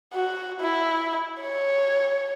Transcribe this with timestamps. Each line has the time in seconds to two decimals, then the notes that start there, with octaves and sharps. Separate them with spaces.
0.14 F#4
0.61 E4
1.41 C#5